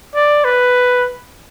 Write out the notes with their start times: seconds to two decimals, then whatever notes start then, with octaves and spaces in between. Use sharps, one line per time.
0.15 D5
0.45 B4